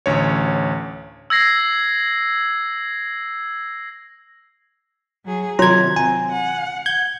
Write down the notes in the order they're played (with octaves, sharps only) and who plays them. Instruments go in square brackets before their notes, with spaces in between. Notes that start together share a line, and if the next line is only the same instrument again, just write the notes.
[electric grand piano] A1 D2 C#5
[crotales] E6 G#6 A#6 C7
[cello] F#3 G#4
[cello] C3 D#3 [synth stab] F#3 [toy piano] F4 C#5 C6 [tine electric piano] A#5 G#6
[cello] C4 [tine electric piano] G#5
[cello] F#5
[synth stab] G6 [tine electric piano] G#6